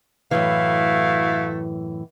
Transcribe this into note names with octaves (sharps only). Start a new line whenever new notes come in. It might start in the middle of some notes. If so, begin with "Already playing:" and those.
F#2 A2 E3 A3 E4 F#4 F5